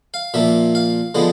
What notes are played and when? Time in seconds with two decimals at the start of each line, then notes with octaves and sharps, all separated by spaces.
0.14 F5
0.34 A#2 F3 A#3 E5
0.75 F5
1.15 D3 F3 G#3 B3